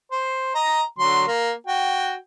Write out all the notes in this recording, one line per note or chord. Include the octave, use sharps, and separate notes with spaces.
C5
D#5 A#5
D3 F#3 C6
A#3
F#4 G5